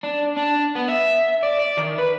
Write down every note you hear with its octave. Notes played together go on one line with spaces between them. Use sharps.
D4
D4
B3
E5
D5
D5
D#3
B4